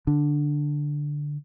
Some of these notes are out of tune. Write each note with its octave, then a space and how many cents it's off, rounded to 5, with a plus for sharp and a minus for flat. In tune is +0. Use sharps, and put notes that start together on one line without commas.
D3 +0 D4 +0